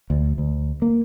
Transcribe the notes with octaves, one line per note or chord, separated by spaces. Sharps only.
D2
D2
A#3